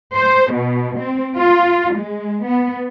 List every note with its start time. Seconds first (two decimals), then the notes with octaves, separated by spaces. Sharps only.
0.16 C5
0.53 B2
0.99 C4
1.37 F4
1.95 G#3
2.46 B3